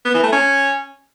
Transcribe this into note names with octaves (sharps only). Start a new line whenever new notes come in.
B3
E3
A3
C#4